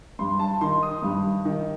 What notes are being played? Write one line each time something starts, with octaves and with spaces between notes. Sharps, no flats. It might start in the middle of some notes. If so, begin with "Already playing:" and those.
G2 C6
A5
D#3 C6
D#6
G2
D#3